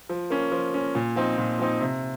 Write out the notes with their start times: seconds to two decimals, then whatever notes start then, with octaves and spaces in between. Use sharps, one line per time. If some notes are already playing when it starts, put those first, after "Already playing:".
0.09 F3
0.30 A#3 C#4
0.52 F3
0.74 A#3 C#4
0.95 A#2
1.16 F3 C4 D#4
1.38 A#2
1.59 F3 C4 D#4
1.81 C3